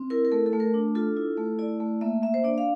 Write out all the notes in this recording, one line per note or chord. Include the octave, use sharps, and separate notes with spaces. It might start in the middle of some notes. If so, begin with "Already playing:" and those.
Already playing: C4
E4 A#4
A#4
A3 A4
A4
A3
A#4
D4
F4 A4
E4
A3
E4 D5
A3
A#3 E5
A#3 E5
C5
D4 D5
F5